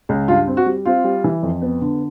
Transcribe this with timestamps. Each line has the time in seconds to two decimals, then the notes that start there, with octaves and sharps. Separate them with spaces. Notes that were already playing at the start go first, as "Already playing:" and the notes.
0.09 C#2
0.28 G2 F4
0.47 C4
0.57 F#4
0.66 G3
0.85 C4 F4
1.04 G3
1.24 E3
1.43 F2
1.62 B3
1.81 D3